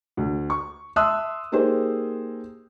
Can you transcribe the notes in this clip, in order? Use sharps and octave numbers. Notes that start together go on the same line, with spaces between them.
D2
C#6
E5 A5 C6 D#6 E6 F#6
A#3 D#4 G4 G#4 C5